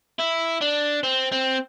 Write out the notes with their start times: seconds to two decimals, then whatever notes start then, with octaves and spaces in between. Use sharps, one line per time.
0.19 E4
0.62 D4
1.03 C4
1.32 C4